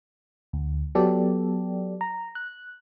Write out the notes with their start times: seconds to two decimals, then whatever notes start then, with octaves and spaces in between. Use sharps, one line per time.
0.53 D2
0.95 F#3 B3 G4 A4 D5
2.01 A#5
2.35 F#6